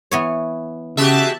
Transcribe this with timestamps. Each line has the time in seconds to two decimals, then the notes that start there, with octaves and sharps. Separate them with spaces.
0.11 E3 B3 C#5
0.97 C#3 G#3 F#4 G4 E5 A5 F#6